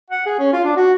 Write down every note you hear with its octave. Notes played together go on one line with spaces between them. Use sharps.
F#5
G#4
C#4
F4
D4
F#4